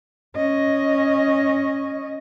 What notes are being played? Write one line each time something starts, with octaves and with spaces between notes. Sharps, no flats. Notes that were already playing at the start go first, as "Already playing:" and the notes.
C#4 D#5